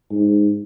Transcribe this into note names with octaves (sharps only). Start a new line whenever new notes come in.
G#2